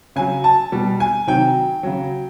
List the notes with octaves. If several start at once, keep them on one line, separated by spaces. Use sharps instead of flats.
C#3 F#3 G#5
A5
B2 G3
G#5
C3 D#3 F#3 G5
C#3 F#3